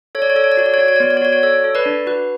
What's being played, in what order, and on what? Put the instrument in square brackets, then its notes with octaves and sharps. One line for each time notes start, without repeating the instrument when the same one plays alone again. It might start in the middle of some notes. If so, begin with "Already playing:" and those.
[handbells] A4 C#5
D5
C#5
A4 D5
C#5
D5
F#4 C#5
D5
C#5
F#4 D5
C#5
D5
B3 C#5
D5
C#5
F#4 D5
C#5
A4 C#5
A4
B4 D5
D4
F#4 B4